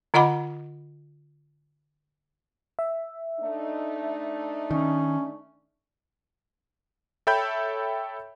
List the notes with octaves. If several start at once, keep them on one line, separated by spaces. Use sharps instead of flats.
D3 F4 D#5 F#5 B5 D6
E5
A3 D4 D#4
D#3 C#4
A4 C#5 E5 G5 B5 G6